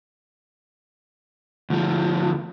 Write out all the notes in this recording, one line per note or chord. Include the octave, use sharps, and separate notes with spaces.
D2 F3